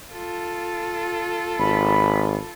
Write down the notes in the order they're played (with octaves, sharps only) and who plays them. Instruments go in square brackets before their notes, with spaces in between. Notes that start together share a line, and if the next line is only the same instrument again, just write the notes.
[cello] F4 A4
[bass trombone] G#1 [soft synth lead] B5